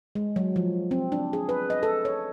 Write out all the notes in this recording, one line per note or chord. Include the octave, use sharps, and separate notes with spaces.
G#3
F#3
F3
C4
D4
G#4
B4
D#5
A4
C#5